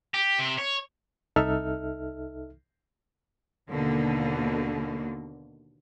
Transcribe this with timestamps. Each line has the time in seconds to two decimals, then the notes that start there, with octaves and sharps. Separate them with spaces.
0.14 G4
0.39 C3
0.59 C#5
1.36 C2 D#4 A4 E5 F6
3.70 D#2 B2 D3 A#3